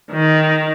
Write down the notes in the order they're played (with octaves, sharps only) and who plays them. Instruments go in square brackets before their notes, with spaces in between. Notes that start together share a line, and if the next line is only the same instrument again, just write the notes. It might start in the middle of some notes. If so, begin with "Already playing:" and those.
[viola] D#3